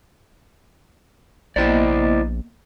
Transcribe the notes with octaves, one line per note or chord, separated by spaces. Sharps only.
A#1 A#3 B3 E4 C5 D5 D#5